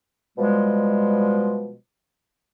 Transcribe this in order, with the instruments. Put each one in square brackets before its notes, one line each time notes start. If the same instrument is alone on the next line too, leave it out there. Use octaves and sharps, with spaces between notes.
[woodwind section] B2 F3 G3 G#3